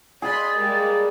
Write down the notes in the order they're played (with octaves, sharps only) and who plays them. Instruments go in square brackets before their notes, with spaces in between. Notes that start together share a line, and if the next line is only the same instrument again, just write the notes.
[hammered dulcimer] G#4 [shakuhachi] D5 [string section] D#5 B5 C6
[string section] G3 G#3 A#3